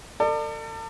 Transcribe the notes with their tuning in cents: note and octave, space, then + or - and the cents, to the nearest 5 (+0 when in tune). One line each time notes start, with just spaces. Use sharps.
A4 +45 D5 +35